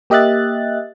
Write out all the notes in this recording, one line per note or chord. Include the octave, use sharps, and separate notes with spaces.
A#3 G4 D#5 E5 F#6 A6